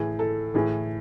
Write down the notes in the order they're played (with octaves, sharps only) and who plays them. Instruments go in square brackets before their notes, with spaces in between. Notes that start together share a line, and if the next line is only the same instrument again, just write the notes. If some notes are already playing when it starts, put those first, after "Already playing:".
Already playing: [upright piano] A2 E3 G#4
A4
A2 E3 G#4